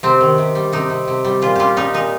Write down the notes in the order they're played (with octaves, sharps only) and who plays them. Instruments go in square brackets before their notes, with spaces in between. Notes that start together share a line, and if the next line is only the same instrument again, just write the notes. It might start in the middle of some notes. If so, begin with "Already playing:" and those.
[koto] C3 C4
D#3
C3
G3
C3 D#4
C3
C3
G3
A#2 F4
G3 F4 G4
G3 D#4
A#2 D#4